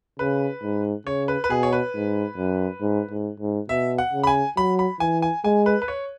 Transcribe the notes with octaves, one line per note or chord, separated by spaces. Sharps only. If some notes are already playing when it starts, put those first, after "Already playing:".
C#3 B4
G#2
C#3 C#5
B4
B4
B2 G#4
C#5
B4
G#2
F#2
G#2
G#2
G#2
B2 E5
F#5
C#3
B5
G#5
F#3 B5
B5
E3 G#5
G#5
G#3 G#5
B4
B4
C#5